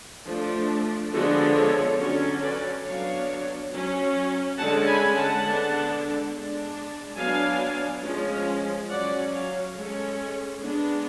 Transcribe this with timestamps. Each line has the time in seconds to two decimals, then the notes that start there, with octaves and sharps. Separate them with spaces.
0.27 F3 A3 D4
1.13 D3 F3 G#3 B3 D4 F#4 A4
1.56 A4 C#5
1.99 D3 F#3 C#4 A4 C#5
2.42 B4 D5
2.85 F#3 B3 D4 C#5 F5
3.71 F#3 C#4
4.58 D3 G#3 C#4 F#5 A5
4.87 G#5 B5
5.15 F#5 A5
5.44 D3 G#3 B3 D4
6.31 G#3 D4
7.17 F#3 B3 D4 F5 G#5
8.03 F3 G#3 C#4
8.89 F#3 C#4 D5 F#5
9.32 C#5 F5
9.76 G#3 C#4 A4 C#5
10.62 G#3 B3 D4